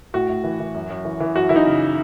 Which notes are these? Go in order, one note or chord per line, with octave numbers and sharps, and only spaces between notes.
A2 F#4
A2
E3
E3
F#2
F#2
E3
E3
F#2 F#4
E3 E4
D#4
C#3